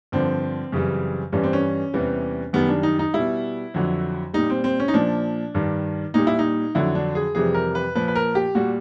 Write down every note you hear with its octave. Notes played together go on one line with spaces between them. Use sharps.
G2 D3 F3 C4
F#2 C#3 E3 G3
G2 E3 G3 C#4
C4
C#4
E2 C3 E3 G3
F#2 D#3 G3 B3
D4
D#4
D#4
B2 G3 E4
F2 D3 F#3
A#2 G3 D#4
C4
C4
C#4
D#4
A#2 F3 D4
G2 D#3 G3
A#2 G3 D#4
E4
D#4
F2 D3 F#3 E4
D4
G#4
F2 C3 E3 G3 G#4
A#4
B4
A#2 F3 B4
B4
A#4
G4
A#2 G3 F#4